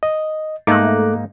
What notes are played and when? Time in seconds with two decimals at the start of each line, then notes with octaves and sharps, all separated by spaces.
0.03 D#5
0.67 G#2 A3 A#3 D#4 D6 F#6